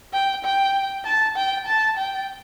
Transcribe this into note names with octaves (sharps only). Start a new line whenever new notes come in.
G5
G5
A5
G5
A5
G5